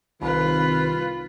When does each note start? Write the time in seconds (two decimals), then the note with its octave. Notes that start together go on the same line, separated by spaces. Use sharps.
0.21 C2 D#3 F4 B4